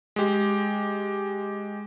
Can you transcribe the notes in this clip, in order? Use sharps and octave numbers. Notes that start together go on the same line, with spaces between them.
G#3 G4